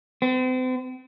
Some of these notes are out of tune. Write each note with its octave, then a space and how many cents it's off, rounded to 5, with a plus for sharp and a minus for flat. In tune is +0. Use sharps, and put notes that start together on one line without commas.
C4 -40